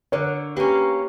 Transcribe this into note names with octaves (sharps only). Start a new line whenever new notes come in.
D3 A#4 C#5
A#3 C#4 G4 B4